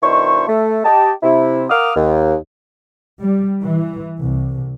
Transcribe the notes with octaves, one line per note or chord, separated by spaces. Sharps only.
B2 D#3 D4 E4 C5 C#6
A3
G4 D#5 A5
C3 E4
A#4 F5 F#5 D6 D#6 F6
D#2
G3
E3
C2